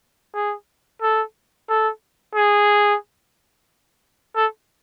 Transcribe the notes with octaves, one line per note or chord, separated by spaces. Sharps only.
G#4
A4
A4
G#4
A4